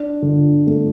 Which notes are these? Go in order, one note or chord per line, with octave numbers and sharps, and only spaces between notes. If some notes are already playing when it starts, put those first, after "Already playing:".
Already playing: D4
D3
A3